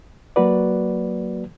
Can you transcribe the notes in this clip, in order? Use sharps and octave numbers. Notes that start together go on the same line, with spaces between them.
F#3 A#3 F#4 B4 D5